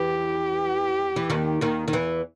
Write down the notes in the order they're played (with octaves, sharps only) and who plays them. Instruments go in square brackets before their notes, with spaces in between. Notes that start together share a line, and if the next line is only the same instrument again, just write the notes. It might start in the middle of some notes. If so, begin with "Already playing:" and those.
Already playing: [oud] E2 E3 [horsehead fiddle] G4
[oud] E3
D#2 D#3
D#2 D#3
D#3
E2 E3